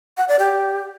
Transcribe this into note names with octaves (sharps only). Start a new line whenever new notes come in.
F#5
D5
G4